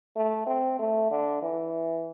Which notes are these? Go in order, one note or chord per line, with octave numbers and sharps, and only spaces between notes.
A3
C4
A3
D3
E3